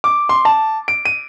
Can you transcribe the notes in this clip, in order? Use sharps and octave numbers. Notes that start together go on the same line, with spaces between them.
D6
C6
A5
D7
D#7